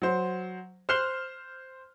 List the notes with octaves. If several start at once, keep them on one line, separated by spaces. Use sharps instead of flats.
F#3 C5
C5 F6 F#6 C7 E7 G7